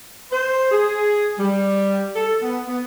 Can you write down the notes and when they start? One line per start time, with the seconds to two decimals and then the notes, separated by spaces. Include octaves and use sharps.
0.32 C5
0.71 G#4
1.39 G3
2.15 A4
2.42 B3
2.67 B3